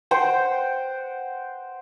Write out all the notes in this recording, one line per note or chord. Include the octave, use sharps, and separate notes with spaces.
C5 F#5 G5 C6